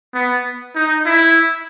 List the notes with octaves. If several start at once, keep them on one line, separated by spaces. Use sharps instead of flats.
B3
D#4
E4